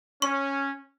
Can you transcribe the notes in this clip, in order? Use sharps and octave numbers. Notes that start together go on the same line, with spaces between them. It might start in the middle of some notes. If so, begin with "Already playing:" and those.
C#4 C#6